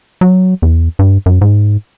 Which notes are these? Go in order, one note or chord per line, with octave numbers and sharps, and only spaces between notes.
F#3
E2
G2
F#2
G#2